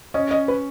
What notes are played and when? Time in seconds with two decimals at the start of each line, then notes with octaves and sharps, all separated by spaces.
0.14 C#4 D#5
0.31 D#5
0.48 B4